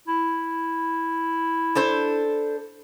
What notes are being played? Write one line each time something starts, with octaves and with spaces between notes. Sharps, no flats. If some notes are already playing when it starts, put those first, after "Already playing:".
E4
D4 A4 C5